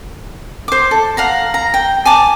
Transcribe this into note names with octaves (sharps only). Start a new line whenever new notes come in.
C5 D6
A4
F5 F#5 A#5
A#5
G5
G#5 A5 D6